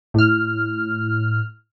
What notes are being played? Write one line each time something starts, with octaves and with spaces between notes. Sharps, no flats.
A2 F6